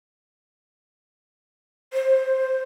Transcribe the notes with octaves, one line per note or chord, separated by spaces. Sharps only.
C5